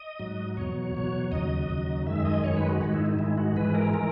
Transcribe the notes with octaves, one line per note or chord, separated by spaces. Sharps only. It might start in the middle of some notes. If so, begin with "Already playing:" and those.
Already playing: D#5
G#2 F#3
E2 B2 F#3 C#5
E2 B2 F#3
D#2 C#3 F#3 D#5
D#2 C#3 F#3
F#2 D#3 G#3 E5
D#5
F#2 D#3 G#3 C#5
B4
F#4
G#2 D#3 G#3 F#4
E4
D#4
G#2 D#3 G#3 E4
F#4
G#2 E3 G#3 B4
A#4
E3 G#3 A#4